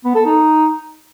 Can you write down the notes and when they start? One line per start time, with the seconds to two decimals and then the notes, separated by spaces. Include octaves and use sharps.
0.05 B3
0.15 A4
0.26 D#4